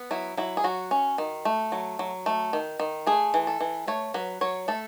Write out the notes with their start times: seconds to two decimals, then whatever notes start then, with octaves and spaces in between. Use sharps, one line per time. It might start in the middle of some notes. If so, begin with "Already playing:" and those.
Already playing: B3
0.11 F#3 E4
0.37 F#3 E4
0.57 G#4
0.64 F#3 F#4
0.91 C#4
1.18 D#3
1.45 A3
1.72 F#3
1.99 F#3
2.26 A3
2.53 D#3
2.80 D#3
3.07 A3 G#4
3.34 E3
3.47 A4
3.60 E3
3.88 A3 C#5
4.14 F#3 B4
4.41 F#3 C#5
4.68 A3 A4